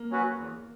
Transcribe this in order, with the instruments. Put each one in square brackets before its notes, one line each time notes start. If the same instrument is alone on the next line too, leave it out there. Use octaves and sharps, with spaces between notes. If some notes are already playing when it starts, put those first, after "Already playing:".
Already playing: [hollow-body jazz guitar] A#3
[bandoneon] F#3 C#4 F#4 B4
E2